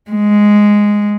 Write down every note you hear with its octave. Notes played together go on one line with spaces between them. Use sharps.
G#3